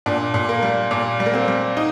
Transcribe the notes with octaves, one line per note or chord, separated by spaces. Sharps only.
A#2 D4
A#2
A#3
G3
A#2
G3
A#3
C4
G3
D#4